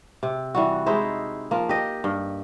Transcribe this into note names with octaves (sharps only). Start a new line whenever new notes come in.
C3
E3 G3 F#4
G#3 D#4 E4 C5
F3 A#3
G4 D#5
G2